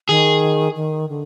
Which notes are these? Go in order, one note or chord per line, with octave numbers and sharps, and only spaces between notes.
D#3 G#4
D#3
D3